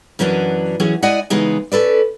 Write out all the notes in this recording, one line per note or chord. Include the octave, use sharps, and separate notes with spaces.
F#2 E3 F#3 C#4 D4
E3 F#3 C#4 G#4
G#3 E4 D5 D#5 F#5 G#5
C#3 E3 G#3 B3 D#4 G#4
C#4 A4 B4 D5